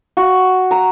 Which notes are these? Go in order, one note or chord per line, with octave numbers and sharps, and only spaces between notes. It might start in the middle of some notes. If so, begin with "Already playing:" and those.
F#4
A#5